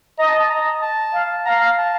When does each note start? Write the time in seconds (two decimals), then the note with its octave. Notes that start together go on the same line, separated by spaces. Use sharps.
0.19 D#5 A#5
0.29 A5
0.40 A5
0.50 A#5
0.82 A5
1.14 F5
1.46 F5 A#5
1.78 A5